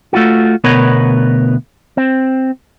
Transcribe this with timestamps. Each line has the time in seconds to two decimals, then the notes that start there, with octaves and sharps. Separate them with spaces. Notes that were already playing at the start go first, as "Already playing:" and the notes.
0.13 A3 F4 F#4
0.64 D2 B2 B3 A#4 B4 C#5
1.97 C4